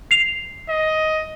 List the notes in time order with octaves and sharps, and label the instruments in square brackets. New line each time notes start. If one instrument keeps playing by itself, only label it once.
[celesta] C7 F7
[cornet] D#5